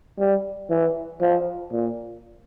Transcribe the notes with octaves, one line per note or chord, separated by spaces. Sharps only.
G3
E3
F3
A#2